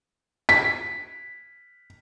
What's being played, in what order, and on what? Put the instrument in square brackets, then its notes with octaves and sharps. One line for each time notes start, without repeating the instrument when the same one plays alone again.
[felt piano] B6